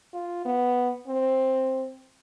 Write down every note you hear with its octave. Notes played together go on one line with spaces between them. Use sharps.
F4
B3
C4